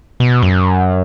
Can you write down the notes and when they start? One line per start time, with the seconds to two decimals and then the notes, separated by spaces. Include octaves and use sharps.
0.20 B2
0.43 F#2